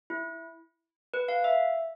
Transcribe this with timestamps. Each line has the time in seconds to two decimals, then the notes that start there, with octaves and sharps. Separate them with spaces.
0.10 E4
1.14 B4
1.28 F5
1.44 E5